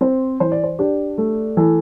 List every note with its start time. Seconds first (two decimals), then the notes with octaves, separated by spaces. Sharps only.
0.01 C4 C5
0.40 E3 C5
0.52 D5
0.64 C5
0.79 D4 G4
1.18 A3
1.57 E3 A4